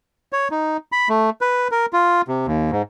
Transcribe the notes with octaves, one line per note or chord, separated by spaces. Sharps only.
C#5
D#4
B5
A3
B4
A#4
F4
C3
D#2
G#2